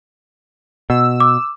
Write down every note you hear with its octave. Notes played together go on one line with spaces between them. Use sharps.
B2 E6
D6